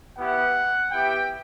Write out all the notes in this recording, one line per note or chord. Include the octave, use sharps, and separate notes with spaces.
B3 E4 G4 F#5
B3 E4 G4 G5